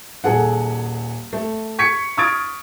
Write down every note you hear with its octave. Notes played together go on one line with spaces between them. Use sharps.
D#1 G#4 A4 F#5
A3
C#6 G#6 B6 C#7
C#6 D#6 F6 G#6 A6 D7